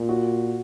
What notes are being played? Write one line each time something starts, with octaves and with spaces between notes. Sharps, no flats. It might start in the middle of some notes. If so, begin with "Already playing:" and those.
Already playing: A#2
F#4